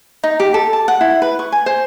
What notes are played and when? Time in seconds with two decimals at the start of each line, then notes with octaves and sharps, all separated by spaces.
0.24 D#4
0.40 G4
0.54 A4
0.73 A5
0.88 F#5
1.01 E4
1.22 B4
1.39 C#6
1.52 G#5
1.66 C5